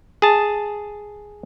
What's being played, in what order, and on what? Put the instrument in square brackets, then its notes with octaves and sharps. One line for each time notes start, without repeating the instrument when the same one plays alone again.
[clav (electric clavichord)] G#4 A5